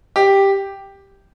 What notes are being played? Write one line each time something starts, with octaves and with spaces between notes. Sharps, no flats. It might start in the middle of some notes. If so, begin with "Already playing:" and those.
G4